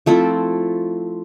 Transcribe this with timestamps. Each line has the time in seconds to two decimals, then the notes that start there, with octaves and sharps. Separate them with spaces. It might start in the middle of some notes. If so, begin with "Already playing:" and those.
0.06 F3 A3 C4 E4